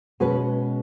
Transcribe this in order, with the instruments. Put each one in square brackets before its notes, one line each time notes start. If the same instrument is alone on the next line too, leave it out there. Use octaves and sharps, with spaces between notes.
[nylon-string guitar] B2 G#3 C#4 G#4 B4